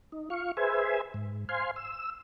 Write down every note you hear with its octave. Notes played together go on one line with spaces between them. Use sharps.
D#4
F4 F5 C#6
G#4 B4 C5 E5 G#5
G#2
C5 F5 G#5 C6
E6